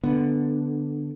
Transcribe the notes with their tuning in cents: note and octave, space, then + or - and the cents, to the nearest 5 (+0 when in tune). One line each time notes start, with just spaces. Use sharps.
D3 +0 B3 +0